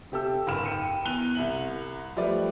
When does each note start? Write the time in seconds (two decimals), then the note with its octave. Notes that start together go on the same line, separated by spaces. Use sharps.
0.12 C3 G4 A4 E6
0.47 F#1 C#2 G#2 B5 F6 E7
0.65 G5 C#7 D#7
1.05 E2 F#6 D#7 F7 G7
1.35 C2 E5 F#7
2.17 F3 G3 A3 B4 D5